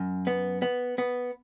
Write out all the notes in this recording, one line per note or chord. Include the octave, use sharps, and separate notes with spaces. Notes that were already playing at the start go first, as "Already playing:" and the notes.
Already playing: F#2
B3
B3
B3